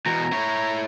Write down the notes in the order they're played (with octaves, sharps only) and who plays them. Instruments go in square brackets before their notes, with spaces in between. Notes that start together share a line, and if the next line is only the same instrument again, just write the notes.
[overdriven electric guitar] E2 B2 [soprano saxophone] A#5
[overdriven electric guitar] E4 C#5